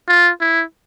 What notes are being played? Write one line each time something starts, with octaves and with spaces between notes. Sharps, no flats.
F4
E4